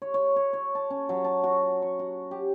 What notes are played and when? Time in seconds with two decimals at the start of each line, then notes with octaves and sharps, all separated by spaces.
0.02 C#5
0.14 C#5
0.36 C#5
0.53 C#5
0.75 A5
0.90 C#4
1.09 F#3
1.24 A5
1.44 F#4
1.82 C#6
1.99 F#4
2.31 G4